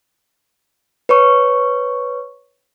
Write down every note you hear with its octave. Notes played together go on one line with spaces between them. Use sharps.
B4 C#5 C#6